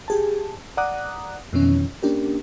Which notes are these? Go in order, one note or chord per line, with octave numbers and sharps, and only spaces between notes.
G4 G#4 A5
D5 F#5 A#5 D6 D#6 F#6
F2 B2 D#3 E3 C#4
A#3 C#4 D4 G4 A#4